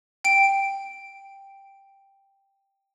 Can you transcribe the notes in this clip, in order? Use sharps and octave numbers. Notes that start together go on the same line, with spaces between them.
G5 D7